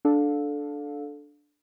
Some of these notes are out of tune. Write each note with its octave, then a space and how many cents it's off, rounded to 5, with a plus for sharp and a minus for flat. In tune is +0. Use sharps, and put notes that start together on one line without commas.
D4 +0 A4 -10 F5 +25